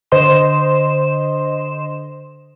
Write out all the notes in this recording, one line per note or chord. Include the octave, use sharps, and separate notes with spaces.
D3 C5 D#5 C6 E7